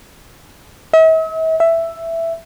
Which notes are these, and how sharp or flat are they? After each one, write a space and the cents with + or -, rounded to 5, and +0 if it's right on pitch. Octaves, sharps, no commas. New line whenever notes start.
E5 -45
E5 +5